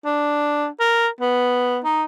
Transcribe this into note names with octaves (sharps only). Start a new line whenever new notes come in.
D4
A#4
B3
D#4